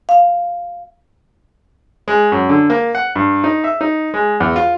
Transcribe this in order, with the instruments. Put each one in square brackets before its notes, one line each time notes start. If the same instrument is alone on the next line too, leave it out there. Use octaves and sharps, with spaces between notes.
[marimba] F5
[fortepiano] G#3
F#2
D3
A#3
F#5
G2
D#4
E5
D#4
G#3
E2
F4